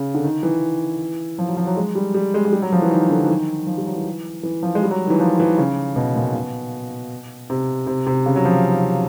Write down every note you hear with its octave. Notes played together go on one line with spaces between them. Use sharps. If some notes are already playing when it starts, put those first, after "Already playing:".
Already playing: C#3
D3
D#3
E3
F3
F#3
F3
F#3
G#3
G3
G3
G#3
G#3
G3
F#3
F3
E3
D#3
D3
E3
D#3
F3
G3
F#3
E3
E3
F3
G#3
G3
F#3
D#3
E3
F3
E3
C#3
B2
A#2
B2
C3
C3
C3
C#3
F#3
F3